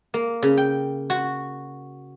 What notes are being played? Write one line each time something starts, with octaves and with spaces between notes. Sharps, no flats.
A#3
C#3
G5
F#4